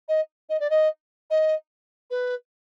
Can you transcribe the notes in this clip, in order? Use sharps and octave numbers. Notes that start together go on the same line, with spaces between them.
D#5
D#5
D5
D#5
D#5
B4